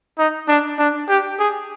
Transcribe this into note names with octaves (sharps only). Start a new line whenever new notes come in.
D#4
D4
D4
G4
G#4